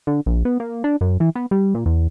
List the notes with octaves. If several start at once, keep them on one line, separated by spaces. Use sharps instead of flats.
D3
A#1
B3
A#3
D4
F#2
E3
B3
G3
A#2
E2